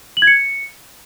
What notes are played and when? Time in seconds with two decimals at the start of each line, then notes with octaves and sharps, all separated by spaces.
0.17 F#7
0.22 G#6
0.27 C#7